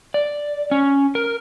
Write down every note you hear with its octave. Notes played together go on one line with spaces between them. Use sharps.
D5
C#4
A#4